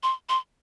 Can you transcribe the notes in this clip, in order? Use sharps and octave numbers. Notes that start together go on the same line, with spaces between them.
C6
C6